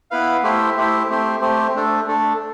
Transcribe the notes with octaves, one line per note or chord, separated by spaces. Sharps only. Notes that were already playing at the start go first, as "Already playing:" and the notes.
B3 E4 B4 F5
A3 E4 G4 C5 E5
A3 E4 G4 C5 E5
A3 C4 G4 C5
A3 C4 G4 C5
A3 D4 A4
A3 D4 A4